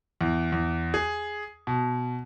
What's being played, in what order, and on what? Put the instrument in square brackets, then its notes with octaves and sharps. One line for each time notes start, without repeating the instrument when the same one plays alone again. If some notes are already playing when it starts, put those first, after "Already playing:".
[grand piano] E2
E2
G#4
B2